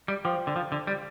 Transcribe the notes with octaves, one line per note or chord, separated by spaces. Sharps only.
G3
F3 C5 G5 D6
D3
F3
D3
G3